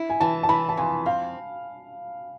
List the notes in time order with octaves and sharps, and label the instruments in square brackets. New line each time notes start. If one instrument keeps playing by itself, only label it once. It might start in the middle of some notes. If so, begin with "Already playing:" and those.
Already playing: [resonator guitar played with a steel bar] E4
[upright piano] G#5
[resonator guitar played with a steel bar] E3 [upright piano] A5
[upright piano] A5
[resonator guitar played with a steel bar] E3 [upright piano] B5
[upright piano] A5
[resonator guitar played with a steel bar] F2 [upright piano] G#5
[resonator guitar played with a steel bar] C4 [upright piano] F5